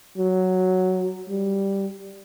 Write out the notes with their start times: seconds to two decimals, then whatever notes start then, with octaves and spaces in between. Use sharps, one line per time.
0.18 F#3
1.29 G3